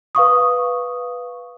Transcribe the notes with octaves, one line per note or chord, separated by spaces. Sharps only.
B4 F5 C#6 D#6